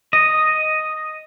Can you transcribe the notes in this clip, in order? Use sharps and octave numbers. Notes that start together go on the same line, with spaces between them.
D#5